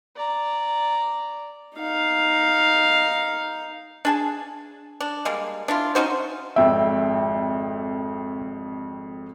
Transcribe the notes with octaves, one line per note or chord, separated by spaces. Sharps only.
D5 A#5
D#4 F5
D4 G#4 A5
D4
G3 G#3 A#3
D4 E4 F4
C#4 D#4 F#4 C5
G#1 F2 E5 G5